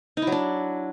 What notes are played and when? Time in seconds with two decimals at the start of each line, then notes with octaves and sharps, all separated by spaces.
0.17 D#4
0.22 E4
0.27 F#3
0.32 D4